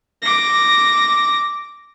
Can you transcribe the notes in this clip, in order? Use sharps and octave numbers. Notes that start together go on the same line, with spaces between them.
D6 A#6